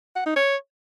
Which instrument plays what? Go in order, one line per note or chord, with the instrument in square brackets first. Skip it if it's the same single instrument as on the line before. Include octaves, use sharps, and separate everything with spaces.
[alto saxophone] F#5
D#4
C#5